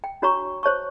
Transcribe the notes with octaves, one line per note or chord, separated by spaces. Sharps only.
G5
D4 F#4 C#5 A#5 C#6
C5 C#5 A5 C#6